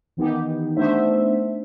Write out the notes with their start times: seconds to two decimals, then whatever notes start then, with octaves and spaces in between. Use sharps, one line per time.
0.17 D#3 E3 B3 D#4 G4
0.77 A3 B3 D4 D#4 C5 E5